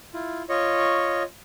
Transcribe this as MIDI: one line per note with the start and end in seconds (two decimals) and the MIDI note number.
0.14 0.43 64
0.14 0.43 65
0.49 1.23 65
0.49 1.23 73
0.49 1.23 75
0.49 1.23 85